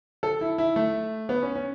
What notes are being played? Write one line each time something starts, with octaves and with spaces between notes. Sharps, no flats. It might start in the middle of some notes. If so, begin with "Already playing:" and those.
A4
E4
E4
A3
B3
C#4
C#4